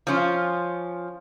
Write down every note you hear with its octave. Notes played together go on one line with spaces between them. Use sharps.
F3 C#4 F4